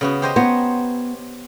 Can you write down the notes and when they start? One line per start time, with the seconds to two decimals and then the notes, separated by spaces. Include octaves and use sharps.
0.01 C#3 B3 F#4
0.22 G4 C5 D#5
0.36 B3 C5 C#5 A#5